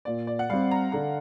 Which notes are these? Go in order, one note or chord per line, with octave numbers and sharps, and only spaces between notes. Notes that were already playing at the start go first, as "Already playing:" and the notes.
A#2 D5
D5
F#5
G3 C4 F5
A#5
D3 A#5